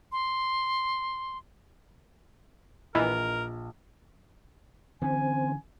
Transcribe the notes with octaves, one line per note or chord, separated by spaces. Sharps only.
C6
A#1 E3 A#4 D#5
D3 E3 C4 C#4 G#5